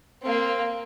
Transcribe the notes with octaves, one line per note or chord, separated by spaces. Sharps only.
A#3 C4